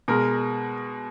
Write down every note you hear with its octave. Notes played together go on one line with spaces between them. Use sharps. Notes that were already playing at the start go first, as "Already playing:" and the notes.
B2 G#3 A#4